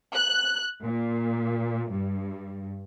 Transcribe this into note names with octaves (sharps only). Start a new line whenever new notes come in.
F#6
A#2
G2